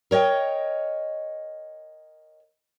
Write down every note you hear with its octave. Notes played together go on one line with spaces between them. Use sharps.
A#4 C#5 D#5 G5